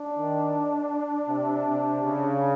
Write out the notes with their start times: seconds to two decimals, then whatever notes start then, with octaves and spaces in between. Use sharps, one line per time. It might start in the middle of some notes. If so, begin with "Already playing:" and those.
Already playing: D4
0.17 D#3
1.28 C3
1.67 C3
2.03 C#3